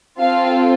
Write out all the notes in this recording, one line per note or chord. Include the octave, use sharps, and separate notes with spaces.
C4 F4 A4 F5